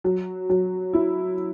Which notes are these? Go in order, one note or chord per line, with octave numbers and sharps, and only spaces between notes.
F#3
F#3
E4